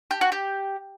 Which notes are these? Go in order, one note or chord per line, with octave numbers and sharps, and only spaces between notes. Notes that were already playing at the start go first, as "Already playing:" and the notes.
G4
F#4
G4